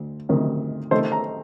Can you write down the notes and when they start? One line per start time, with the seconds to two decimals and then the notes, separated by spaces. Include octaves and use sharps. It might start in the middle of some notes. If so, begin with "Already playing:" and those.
Already playing: D2
0.29 D2 C3 D#3
0.91 C3 D#3 A3 C4 D#4 C5
1.12 A#5